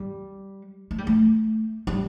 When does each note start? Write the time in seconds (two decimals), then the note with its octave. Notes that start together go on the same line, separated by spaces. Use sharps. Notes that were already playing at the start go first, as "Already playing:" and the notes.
Already playing: G3
0.91 A3
0.98 G3
1.07 A3
1.87 G3